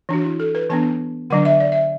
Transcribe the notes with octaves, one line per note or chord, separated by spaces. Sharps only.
E3 D4 F#4
E4
A4
B4
E3 B3 D4 A5
D3 F#3 D4 F#5
E5
D5
E5